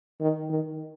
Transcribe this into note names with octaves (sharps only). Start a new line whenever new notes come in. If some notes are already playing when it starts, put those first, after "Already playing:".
D#3
D#3